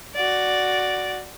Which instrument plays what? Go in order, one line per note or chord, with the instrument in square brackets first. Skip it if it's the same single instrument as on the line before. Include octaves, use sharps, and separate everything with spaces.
[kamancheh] F#4 D5